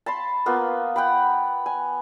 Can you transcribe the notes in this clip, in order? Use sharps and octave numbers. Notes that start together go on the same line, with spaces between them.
A5 B5 C6
A#3 B3 F4
F#5 G5 B5
G#5